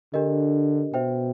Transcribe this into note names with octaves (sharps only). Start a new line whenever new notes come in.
D3 D4 G4 A#4 D#5
B2 C5 E5 G5